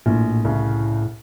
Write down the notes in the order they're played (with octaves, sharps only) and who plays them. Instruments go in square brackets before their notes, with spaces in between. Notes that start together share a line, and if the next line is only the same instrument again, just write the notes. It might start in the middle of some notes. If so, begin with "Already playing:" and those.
[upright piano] A#1 [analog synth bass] A2
[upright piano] C2 C#3